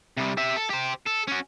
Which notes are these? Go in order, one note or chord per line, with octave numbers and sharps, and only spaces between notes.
C3 G3
G4 E5
A4
G4 C5
A4
C#4 F#4